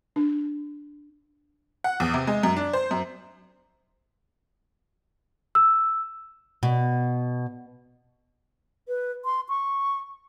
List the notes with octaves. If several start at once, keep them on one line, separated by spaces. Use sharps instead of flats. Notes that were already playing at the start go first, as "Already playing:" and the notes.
D4
F#5
E2
C3
G#3
F#2
D4
C5
F#2
E6
B2
B4
C6
C#6